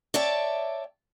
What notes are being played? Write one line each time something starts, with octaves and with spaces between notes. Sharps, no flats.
C#5 D5 E5 G5 A5